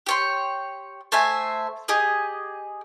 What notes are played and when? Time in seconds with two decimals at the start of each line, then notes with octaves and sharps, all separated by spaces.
0.06 G4 C#5 C6
1.12 A3 C5 E5 G#5
1.88 G4 G#4 D#5